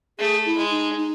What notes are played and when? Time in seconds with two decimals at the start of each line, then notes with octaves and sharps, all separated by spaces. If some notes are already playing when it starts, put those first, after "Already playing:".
0.19 A3 G#4
0.46 E4
0.58 G#3
0.71 D#4
0.97 D#4